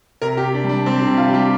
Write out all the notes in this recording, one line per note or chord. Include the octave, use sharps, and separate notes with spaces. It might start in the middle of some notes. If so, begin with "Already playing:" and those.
C3 A#4
G4
C3
D4
G3
D4
G3 C4
D4
C3
F4
G3
G4